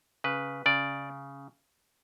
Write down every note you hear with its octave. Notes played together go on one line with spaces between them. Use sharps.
C#3 B4
C#3 D5